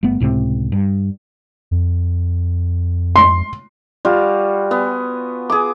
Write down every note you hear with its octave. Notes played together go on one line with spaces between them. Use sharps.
G1 A3 B3
C#2 A2 C3 C4
G2
F2
C6
G3 F4 F#4
B3 G#5
G#4 D6